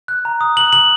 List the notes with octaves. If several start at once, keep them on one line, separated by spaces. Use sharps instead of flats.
F#6
A#5
D#6
F#6 F#7
A#5 F#7